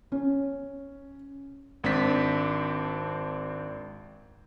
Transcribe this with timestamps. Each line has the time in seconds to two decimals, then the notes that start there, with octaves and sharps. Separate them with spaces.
0.12 C#4
1.84 G#1 C4 D4 B6